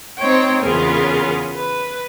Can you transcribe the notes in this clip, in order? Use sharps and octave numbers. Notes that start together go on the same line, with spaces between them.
C4 D#4 C5 C#5 G5
E2 C#3 B3 F4 G#4 A#4
B4